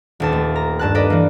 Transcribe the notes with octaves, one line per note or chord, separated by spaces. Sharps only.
D#1 D#2 A5
A3
A#5
G2 A5 F#6
A4 B4 D5 D#5
E3 A#3